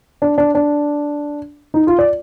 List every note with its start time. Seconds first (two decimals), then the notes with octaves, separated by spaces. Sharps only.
0.22 D4
0.38 D4
0.55 D4
1.74 D#4
1.87 F4
1.99 D5